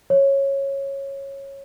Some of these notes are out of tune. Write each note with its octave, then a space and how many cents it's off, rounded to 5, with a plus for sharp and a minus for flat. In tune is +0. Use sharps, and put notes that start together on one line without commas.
C#5 -15